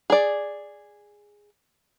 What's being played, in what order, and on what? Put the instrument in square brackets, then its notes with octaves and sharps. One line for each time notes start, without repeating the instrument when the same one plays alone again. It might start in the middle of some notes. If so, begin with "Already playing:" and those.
[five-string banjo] G#4 D5